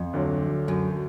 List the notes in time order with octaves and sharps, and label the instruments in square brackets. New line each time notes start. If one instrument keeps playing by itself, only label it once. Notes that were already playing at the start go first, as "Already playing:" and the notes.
Already playing: [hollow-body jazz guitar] F2
[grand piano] D2 D3 F#3
[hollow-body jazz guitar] F#2